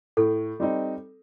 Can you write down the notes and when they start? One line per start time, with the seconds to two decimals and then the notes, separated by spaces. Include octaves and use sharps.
0.17 A2 A4
0.60 G3 C4 D#4